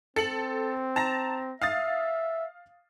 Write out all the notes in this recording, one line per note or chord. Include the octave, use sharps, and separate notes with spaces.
C4 A4 C#7 F#7
A5 A#5 A#6
E5 F5 D#6 A6